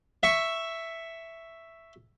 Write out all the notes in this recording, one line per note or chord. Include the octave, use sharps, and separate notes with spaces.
E5 C#6